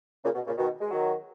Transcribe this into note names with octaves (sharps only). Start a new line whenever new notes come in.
A#2 C#3
B2
A#2 C#3
B2 D#3
G#3
D#3 F#3